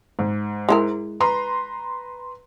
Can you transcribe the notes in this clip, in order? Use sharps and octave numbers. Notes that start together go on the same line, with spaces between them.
G#2
G#3 E4 A#4
B4 A#5 C6